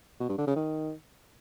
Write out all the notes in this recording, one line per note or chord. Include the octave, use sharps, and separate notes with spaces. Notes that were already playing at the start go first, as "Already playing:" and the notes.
B2
G2
D3
C#3
D#3